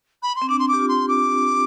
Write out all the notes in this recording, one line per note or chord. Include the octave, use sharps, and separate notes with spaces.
B5
C6
C4
D4 D6
C6
G4 D6
F4
C6
D6